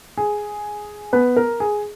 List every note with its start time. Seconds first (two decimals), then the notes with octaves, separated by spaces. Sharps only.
0.17 G#4
1.13 B3 B4
1.37 A#4
1.60 G#4